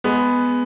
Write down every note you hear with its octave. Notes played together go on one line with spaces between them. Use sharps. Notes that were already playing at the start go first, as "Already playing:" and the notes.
G#3 B3